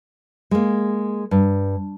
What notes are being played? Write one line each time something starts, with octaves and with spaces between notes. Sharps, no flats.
G#3 A#3
G2